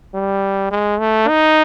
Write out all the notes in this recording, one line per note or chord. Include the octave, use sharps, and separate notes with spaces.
G3
G#3
A3
D#4